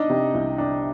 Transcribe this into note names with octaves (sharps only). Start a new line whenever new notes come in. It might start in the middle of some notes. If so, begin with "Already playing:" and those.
Already playing: D4 D#4 D#5
C3
C2
D4